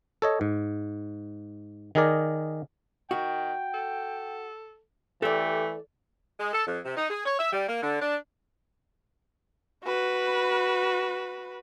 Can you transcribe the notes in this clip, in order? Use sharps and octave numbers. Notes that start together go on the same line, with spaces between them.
A4 C#5 D#5
G#2
D#3 D#4 G#4 A#4 D5
D#3 F#4 G5
A4
E3 A3 G4 A4 D5
G#3
A4
F2
C3
D#4
G#4
C#5
E5
G3
A#3
D3
D4
F#4 B4